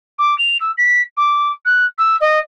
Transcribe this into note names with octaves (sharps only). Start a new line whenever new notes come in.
D6
F7
E6
B6
D6
F#6
E6
D#5